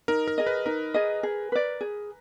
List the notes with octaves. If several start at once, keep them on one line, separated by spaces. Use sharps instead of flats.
D#4 A#4
A#4
G#4 D#5
B4
D#4 A#4
G#4 D#5
G#4
B4 D5
G#4